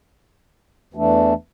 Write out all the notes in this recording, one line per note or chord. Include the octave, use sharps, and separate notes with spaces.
E2 E3 A3 D4